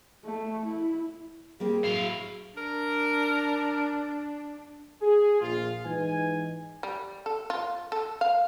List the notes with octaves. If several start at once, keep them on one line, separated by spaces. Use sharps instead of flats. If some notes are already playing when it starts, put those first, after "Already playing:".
A3
E4
G3 A#3 C4 G#4
A2 F#3 E4 F5
D4 A#4
G#4
A#1 F4
G#2 E3 D#4 B4 G#5
G3
A4
F4
A4
F5